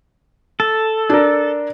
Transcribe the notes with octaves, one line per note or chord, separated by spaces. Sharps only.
A4
D4 A#4